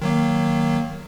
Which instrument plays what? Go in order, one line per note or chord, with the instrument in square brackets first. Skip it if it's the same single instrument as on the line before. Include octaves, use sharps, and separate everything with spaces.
[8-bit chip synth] D#3 F#3 A#3